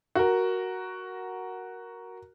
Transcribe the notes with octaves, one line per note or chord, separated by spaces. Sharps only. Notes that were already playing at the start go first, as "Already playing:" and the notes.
F#4 A#4